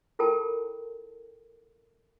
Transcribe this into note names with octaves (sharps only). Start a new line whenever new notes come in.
E4 F4 A4 A#4 G5 A5